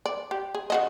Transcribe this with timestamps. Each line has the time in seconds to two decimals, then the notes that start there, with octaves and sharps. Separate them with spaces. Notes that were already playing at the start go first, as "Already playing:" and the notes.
0.06 D5
0.31 G4
0.55 G#4
0.70 C#3 F#4 D#5